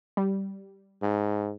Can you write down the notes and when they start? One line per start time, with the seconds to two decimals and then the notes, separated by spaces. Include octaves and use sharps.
0.17 G3
1.02 G#2